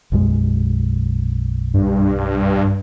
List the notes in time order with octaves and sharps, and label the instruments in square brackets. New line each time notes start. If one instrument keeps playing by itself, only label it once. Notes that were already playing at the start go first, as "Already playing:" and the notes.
[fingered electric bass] B1 F#2 G#3
[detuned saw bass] G2